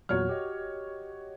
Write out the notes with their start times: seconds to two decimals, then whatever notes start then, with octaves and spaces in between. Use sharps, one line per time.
0.09 E2 A#2 F#3 F#4 C#5 F6
0.29 G4 D#5